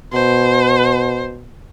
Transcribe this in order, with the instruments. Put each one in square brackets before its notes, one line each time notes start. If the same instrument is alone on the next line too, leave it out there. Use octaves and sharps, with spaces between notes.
[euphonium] B2 [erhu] C5